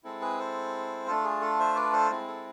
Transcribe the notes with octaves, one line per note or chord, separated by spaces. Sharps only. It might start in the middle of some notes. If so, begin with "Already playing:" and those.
G#3 C4 E4 A4
G#4 B4
A4 C5
A3 D4 F4 A4
G#4
A4
C5 E5
B4 D5
A4 C5
G#3 C4 E4
A4